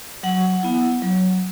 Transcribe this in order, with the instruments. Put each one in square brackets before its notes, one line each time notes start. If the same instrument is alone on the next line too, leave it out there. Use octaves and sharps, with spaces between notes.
[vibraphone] F#3 F#5
B3 E4
F#3